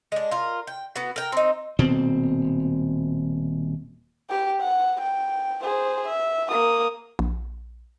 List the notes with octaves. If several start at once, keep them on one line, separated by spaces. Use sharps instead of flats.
G#3 D4
F4 A#4
G5
B3 F#4
A#4 G5
C4 D#4
D#1 B2 C4
G4 G5
F#5
G5
G#4 C5
E5
A#3 D#6
A#1